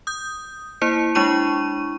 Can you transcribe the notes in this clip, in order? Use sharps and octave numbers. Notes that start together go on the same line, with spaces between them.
D#6 G6
A#3 E4 C5 C#7
G#3 D4 E4 C#6 D#7